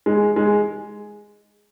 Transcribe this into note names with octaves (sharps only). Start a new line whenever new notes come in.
G#3
G#3